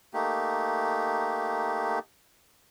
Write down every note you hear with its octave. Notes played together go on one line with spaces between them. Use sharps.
A3 A#3 D#4 G4